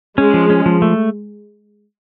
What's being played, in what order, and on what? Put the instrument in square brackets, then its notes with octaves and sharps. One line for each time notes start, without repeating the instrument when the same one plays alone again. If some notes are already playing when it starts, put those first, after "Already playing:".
[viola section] G#3 [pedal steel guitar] C#4
[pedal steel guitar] F3
C#4
F3
A3